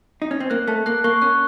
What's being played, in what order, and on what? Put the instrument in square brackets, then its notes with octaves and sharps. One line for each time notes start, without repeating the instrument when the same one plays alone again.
[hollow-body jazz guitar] D#4
C#4
C4
[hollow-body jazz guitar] A#3 [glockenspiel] F#6
[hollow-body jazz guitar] A3 [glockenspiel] A5
[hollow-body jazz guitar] A#3 [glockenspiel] F#6
[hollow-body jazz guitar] A#3 [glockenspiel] C#6
[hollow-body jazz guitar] C#4 [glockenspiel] F#6